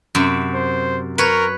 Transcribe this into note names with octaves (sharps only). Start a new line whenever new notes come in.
F#2 C3
C5
A#4 B4 C#5